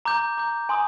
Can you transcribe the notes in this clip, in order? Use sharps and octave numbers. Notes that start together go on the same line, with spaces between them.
A#5 D6 G6
A#5 D6 G6
G#5 C6 D#6